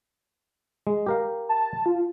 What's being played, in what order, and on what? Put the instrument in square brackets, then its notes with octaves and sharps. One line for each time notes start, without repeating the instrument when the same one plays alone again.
[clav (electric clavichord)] G#3
G4 A#4 F5
[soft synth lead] A5
F4